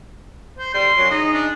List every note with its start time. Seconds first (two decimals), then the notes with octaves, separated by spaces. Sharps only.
0.58 C5
0.74 D3 G3 C6
0.97 F#2 F#3
1.11 E3 D#4 G#4 D#5
1.34 D4